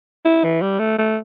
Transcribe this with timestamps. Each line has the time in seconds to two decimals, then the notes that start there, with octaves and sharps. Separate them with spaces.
0.25 E4
0.44 E3
0.62 G3
0.79 A3
0.98 A3